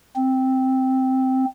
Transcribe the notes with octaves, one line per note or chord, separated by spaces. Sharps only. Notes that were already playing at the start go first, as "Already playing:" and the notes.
C4